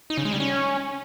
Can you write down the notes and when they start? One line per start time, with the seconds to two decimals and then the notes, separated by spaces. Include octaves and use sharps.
0.10 D#4
0.18 C#3
0.25 G#3
0.33 G3
0.40 C#4